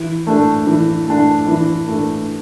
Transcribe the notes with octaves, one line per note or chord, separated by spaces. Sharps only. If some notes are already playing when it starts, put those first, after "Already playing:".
Already playing: E3
A3 D4
E3
A3 D4
E3
A3 D4